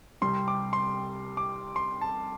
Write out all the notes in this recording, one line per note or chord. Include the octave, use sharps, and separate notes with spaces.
C2 C3 G3 C6
D6
C6
D6
C6
A5